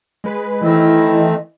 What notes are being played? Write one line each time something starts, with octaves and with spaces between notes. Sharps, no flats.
G#3 B4
D#3 E3 A3 C4 E4 D#5